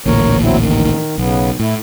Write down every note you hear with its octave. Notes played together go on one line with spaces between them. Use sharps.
A1 D2 A#2 A#4 C#5
F#3 C4 E4
D#3
B1 C#3 B3
A2 E4